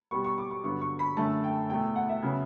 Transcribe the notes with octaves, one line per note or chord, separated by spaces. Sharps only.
B2 G3 B3 C#6
C#6
D6
C#6
G2 D3 F#3 B3 C#6
C#6
B5
F#2 D3 A3 A5
G5
E2 B2 A3 G5
F#5
E5
C#3 F#3 B3